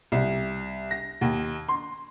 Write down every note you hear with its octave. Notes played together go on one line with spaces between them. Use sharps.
C2
A#6
D#2
C6